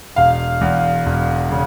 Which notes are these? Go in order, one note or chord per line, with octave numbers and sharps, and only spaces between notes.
E1 F5
E2
E1
C#3